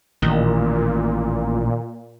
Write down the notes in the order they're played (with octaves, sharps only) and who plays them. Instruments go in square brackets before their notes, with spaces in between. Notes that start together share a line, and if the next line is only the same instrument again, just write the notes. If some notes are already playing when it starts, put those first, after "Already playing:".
[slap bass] A1 [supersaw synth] A#2 [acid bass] D#3